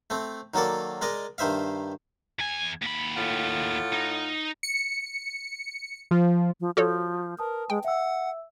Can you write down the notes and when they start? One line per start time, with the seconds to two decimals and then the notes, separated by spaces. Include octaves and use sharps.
0.10 A3 C4
0.54 D#3 F#3 A#3 A4 D5
1.01 G#3 A#4 D5 D#5
1.38 G2 D#3 C5 E5 F5
2.39 E2 G#5
2.82 D#2 B5
3.16 A2 F4 F#5
3.93 D#4
4.63 C#7
6.11 F3
6.60 F3
6.77 F3 F#4 A4 C#5 F6 G6
7.39 A#4 B4 A5 D#6
7.70 G#3 G5
7.84 E5 F#5 E6